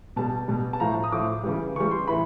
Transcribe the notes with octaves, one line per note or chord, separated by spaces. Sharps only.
B2 G3 A5
B2 G3
A5
A2 F3 A#5
D#6
A2 F3 D6
C#3 E3 G3
C#3 E3 G3 C#6
C6
A2 E3 B5